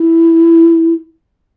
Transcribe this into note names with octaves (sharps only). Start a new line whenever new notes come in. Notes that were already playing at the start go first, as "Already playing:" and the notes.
Already playing: E4